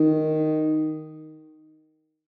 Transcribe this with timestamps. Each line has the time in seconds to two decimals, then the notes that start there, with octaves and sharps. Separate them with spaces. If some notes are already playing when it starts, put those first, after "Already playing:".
Already playing: D#3